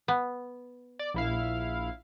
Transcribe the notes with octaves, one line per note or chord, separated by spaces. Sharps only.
B3
D5
A#1 E4 F5